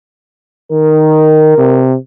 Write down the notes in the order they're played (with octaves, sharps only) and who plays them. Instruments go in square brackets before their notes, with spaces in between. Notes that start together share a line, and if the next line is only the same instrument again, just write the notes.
[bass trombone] D#3 [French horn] A#4
[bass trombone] C3